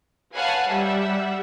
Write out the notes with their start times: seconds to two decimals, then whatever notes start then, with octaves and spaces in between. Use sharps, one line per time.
0.35 B4 C#5 F5 F#5 G#5 A5
0.69 G3 E5 F#5